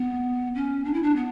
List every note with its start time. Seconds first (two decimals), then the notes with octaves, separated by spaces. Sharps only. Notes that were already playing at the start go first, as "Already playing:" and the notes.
Already playing: B3
0.55 C#4
0.85 D4
0.94 E4
1.03 D4
1.16 B3